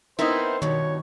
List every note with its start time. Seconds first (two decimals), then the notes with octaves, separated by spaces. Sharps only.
0.19 B3 C4 D#4 E4 A#4 C5
0.62 G2 B2 D#3 C#5